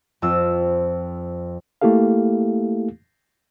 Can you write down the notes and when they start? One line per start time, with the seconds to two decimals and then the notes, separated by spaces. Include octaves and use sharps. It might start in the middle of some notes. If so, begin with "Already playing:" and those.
0.22 F2 C4 F4 E6
1.81 A3 A#3 E4 G4 A4 F5